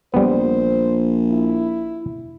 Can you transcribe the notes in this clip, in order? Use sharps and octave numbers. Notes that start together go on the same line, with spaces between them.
A#1 G3 B3 C5
E4